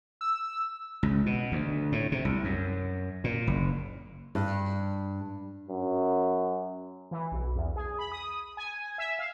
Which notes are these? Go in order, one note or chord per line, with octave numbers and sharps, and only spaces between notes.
E6
C#2
B2
D2
A2
C3
C2
F#2
A#2
F#1
G2
F#2
E3
B1
E2
G#4
B5
D#6
G#5
E5
F5